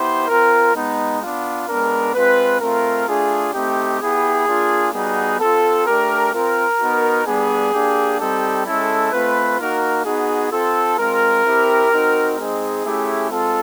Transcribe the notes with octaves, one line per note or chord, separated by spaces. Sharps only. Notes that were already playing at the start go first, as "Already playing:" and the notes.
Already playing: B3 E4 G4 C5
C4 F4 A#4
G#3 B3 D#4
B3 D4 F4
G#3 B3 D4 A#4
G#3 C4 F4 B4
A3 C4 F4 A#4
A3 D4 F4 G#4
A3 C4 D#4 G4
B3 E4 G4 G#4
A#3 D4 F4
G3 B3 D#4 F#4 G#4
C4 F4 A4
A3 D4 G4 A#4
C4 F4 A#4
B3 D#4 F#4
G3 B3 D4 G#4
A#3 D4 G4
G3 C4 D#4 G4 A4
G#3 C#4 E4 A4
A3 C4 F4 B4
A#3 D#4 F#4 A#4
B3 D#4 F#4 G#4
C4 F4 A4
G#3 C4 F4 A#4
C4 E4 G4
C4 D#4 F#4
G#3 C4 D#4 G#4
A3 C#4 E4 G4
G#3 C4 F4 A4